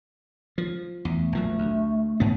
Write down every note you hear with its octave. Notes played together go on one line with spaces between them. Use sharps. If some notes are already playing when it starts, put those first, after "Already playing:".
F3
E2 A3
A#1 F3 F#3
D2
G#2 B3